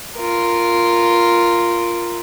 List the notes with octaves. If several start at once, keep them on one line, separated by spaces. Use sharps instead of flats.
F4 A#4